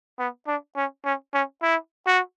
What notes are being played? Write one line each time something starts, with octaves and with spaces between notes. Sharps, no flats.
B3
D4
C#4
C#4
C#4
E4
F#4